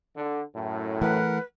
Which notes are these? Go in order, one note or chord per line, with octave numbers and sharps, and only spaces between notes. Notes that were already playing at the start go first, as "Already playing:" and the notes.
D3
F#2 A2
E3 A3 A#4 B4 F#5